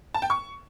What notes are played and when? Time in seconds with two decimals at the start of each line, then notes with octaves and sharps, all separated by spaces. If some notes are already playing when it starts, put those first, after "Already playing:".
0.14 A5
0.22 G5
0.30 C#6